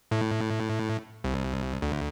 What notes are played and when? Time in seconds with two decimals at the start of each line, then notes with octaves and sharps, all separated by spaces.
0.11 A2
1.24 C2
1.82 D2